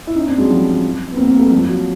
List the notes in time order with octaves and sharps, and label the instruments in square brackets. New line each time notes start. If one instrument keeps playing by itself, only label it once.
[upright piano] E4
C#4 D#4
C4 D4
F#3 G#3
F3 G3
B3
A#3 C4
B3
A#3 C4
G3 A3
F3 G3
F3
F#3